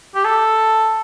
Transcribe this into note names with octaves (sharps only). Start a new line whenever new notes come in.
G4
A4